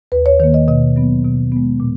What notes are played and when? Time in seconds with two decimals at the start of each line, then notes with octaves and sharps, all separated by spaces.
0.12 D#2 B4
0.26 C#5
0.40 D#3 C#5
0.44 A#3
0.54 D#5
0.68 B2 D#5
0.96 F#3 B3
1.24 B2
1.52 G#3 B3
1.80 A#2